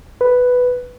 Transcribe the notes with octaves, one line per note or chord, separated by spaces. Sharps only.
B4